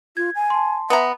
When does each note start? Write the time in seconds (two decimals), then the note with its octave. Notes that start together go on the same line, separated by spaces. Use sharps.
0.17 F4 G#6
0.35 G#5
0.50 A5 C6
0.90 B3 E5 A#5